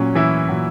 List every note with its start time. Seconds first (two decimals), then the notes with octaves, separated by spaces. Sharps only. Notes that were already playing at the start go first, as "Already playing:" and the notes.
Already playing: A#2 F#3 C#4
0.15 E3 E4
0.48 A#2 F#3